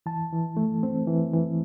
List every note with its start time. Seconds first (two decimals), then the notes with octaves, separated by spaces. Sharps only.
0.06 E3 A5
0.32 E3
0.57 A3
0.83 C4
1.07 E3
1.33 E3